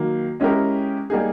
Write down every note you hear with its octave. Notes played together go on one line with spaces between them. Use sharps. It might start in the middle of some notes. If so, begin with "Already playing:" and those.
Already playing: D#3 F#3 A#3
G#3 C#4 E4 G4 A#4
G3 A#3 D#4 G#4